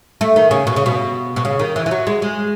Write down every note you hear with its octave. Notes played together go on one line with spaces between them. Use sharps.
A3
D#3
C#3
B2
C#3
B2
B2
C#3
D#3
E3
E3
F#3
G#3
G#3